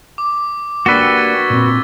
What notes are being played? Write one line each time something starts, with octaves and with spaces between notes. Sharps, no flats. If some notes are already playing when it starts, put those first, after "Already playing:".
D6
A#3 D4 F#4 G4 B4 E6 A6 G7
G#6
A#2 C4